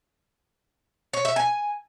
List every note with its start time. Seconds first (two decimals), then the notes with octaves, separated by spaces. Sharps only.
1.13 C#5
1.25 E5
1.36 G#5